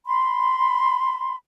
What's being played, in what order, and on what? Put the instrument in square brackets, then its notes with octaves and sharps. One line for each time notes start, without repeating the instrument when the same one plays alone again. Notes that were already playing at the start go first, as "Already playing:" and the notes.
[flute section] B5 C6